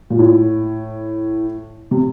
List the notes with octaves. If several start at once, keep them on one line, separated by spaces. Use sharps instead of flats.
A#2
A2
C3